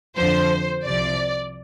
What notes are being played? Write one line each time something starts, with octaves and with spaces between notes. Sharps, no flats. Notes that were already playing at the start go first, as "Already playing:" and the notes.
F2 D3 F3 C5
C2 C3 F3 D5